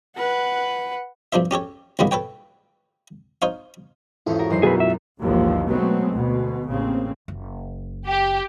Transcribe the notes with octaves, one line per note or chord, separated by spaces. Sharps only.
B4 F#5
G2 F3 D4 C5 E5
C#4 G4 A4 C#5
C#2 A2 D#3 G3 A#3 B3
A4 B4 C#5 G5
D#4 C5 C#5 F5
G#1 E2 C#4 E4 F4 A4
F#4 A#4
F#2 E3 D#4 C5 C7
B1 F#3 F#4 G#4 B4
E5
A#1 D#2 G#2 D3 E3 F3
B2 F#3 G#3 A3 B3 C4
D2 B2
A1 C#3 A#3 C4
F#1
G4